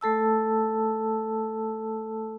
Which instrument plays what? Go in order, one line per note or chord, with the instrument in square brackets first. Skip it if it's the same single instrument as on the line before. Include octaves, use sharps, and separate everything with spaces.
[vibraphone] A3 A4 A5 E6